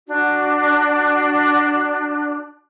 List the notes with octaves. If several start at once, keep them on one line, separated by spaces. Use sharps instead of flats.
D4 F#4